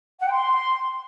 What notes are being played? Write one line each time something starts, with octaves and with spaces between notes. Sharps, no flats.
F#5
G5
C6